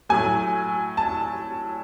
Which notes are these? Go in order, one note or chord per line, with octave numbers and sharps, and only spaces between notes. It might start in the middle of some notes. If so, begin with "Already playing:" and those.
A2 F#3 A3 G#5
A5